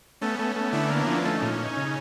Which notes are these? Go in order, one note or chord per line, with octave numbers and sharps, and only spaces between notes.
A3 B3 C#4
A3
A3
D3 D4 E4
A#3
F3
A3 C#4 D#4
A#2
C#4
C#3